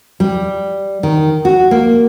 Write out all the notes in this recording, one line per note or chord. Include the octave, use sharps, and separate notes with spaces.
G3
D#3
F#4
A#3